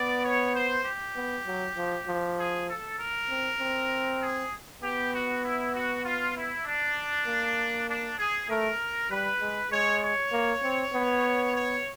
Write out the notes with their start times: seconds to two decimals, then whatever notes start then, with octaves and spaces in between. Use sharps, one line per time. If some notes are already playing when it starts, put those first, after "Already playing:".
Already playing: B3 D5
0.24 C#5
0.55 C5
0.85 G4
1.16 B3
1.46 F#3
1.77 F3
2.07 F3
2.39 G#4
2.68 A4
2.99 A#4
3.29 C4
3.60 C4
4.21 G#4
4.82 B3 G4
5.13 F#4
5.43 E4
5.74 F#4
6.05 F4
6.36 E4
6.65 D4
7.27 A#3
7.89 D4
8.18 G#4
8.49 A3 A#4
9.10 G3 B4
9.41 G#3
9.71 G#3 C#5
10.02 C#5
10.32 A#3
10.63 C4
10.93 B3
11.55 C#5